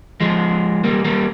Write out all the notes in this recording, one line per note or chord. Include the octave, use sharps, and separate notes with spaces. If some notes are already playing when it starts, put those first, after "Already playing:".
F3 G#3
G3 A#3
G3 A#3